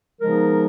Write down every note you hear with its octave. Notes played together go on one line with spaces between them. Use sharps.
C#3 F3 G#3 B3 D#4 A#4